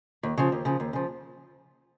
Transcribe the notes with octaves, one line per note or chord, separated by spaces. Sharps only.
D#2
C#3 F3
D#2
C#3 F3
D#2
C#3 F3